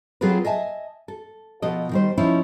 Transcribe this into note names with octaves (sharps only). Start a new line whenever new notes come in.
F#3 C4 F4 G#4 A4 B4
D#5 E5 G#5 A5
A4
B2 F3 A4 D#5
D#3 G3 C5
F3 C#4 D#4 E4